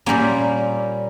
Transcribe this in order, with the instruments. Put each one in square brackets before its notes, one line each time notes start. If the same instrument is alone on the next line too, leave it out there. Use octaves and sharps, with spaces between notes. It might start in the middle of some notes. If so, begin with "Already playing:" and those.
[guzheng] A#2 G3 A#3 C#4